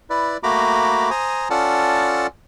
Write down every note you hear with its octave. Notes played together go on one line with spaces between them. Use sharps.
E4 B4 D5
A3 A#3 F#4 A#5 B5 D6
C5 G#5 A#5 D#6
C#4 F4 A4 D5 F#5 A5